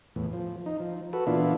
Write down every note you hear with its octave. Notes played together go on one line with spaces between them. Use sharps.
E2 A2
F3
D#4
F3
F#4 A4 B4
A#2 E3 B3 D4 E4 F4